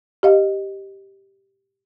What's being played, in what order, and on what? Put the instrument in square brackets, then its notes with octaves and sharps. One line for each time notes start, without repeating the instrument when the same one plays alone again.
[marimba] G4 D#5 F5